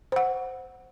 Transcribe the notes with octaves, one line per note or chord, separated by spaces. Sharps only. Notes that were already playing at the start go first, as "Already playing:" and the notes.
C5 F#5